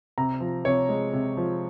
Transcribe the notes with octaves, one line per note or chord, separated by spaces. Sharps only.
C3 A#5
F3
C3 C#5
G#3
C3
F3